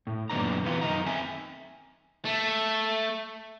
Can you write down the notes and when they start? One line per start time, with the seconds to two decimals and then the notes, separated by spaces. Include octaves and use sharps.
0.07 A2
0.30 F#2 A#2 D#3 B3 D4 A#5
0.64 C3 E3 B3 F4
0.81 F#2 D#3 D#4 A#5
1.06 C4 E5 G#5
2.25 A3